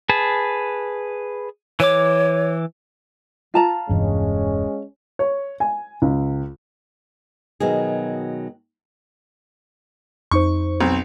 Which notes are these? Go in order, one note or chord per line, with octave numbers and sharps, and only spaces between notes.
G#4 B4 A5
E3 C#5 D6
F4 A5 A#5
E1 G2 E3 G#3 C#4
C#5
G#5
C#2
B2 D#3 F#3 G#4
F2 D#4 C5 C#6
B1 C4